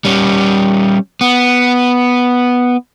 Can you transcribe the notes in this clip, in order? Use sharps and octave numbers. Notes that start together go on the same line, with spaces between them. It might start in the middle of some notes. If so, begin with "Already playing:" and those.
G3 C#4
B3